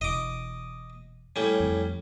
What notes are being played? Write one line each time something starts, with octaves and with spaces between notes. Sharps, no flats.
E1 D#5 D6
A2 G3 C#4
F2